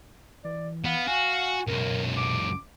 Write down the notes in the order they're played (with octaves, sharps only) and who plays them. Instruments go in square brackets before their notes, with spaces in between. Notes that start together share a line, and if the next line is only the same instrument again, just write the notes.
[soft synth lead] E3 [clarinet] D5
[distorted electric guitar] B3 [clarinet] F5
[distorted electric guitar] F#4 [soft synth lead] G#5
[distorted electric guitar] C#2 F#2 [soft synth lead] B2 [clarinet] A#4
[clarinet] D6